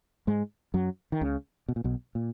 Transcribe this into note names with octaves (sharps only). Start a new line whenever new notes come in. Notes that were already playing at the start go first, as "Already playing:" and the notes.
G#2 G#3
F#2 F#3
D#3
C#2 C#3
B2
A#2
B1 B2
A#2